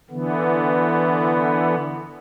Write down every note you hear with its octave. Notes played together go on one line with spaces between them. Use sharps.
D3 E3 B3